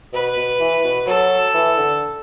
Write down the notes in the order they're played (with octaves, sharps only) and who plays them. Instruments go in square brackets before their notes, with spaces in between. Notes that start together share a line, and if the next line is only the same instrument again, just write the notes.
[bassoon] B2 [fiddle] B4
[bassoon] B2
E3
B2
[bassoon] F#3 [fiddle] A4
[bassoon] E3
D3